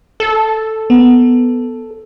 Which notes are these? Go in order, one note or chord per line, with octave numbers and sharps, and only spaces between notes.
A4
B3